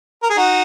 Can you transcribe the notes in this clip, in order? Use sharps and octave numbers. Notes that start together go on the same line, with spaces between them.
A#4
G#4
D#4 F#4